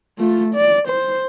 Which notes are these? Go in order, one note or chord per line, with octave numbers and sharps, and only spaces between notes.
A3 F4
D5
C5